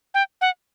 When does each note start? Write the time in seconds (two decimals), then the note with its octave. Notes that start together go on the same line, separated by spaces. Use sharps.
0.14 G5
0.41 F#5